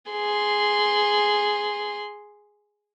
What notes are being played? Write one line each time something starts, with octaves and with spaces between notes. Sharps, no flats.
G#4 C6